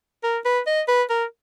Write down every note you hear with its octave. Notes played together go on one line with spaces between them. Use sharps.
A#4
B4
D#5
B4
A#4